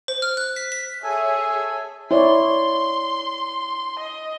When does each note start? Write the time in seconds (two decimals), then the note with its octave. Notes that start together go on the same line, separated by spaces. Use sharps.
0.08 C5
0.22 F6
0.37 F#6
0.56 B6
0.72 B6
1.04 G#4 A4 C#5 E5 G#5
2.11 E4 C#5 D5 C6
3.99 D#5